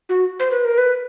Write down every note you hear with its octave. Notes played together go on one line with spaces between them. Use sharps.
F#4
C5
B4
A#4
B4